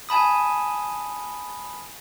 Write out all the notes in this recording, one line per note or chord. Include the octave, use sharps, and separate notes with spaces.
G#5 A5 B5 D#6